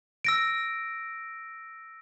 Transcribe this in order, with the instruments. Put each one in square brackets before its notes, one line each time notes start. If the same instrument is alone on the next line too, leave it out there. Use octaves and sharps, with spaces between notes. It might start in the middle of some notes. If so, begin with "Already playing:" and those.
[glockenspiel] E6 A#6 D7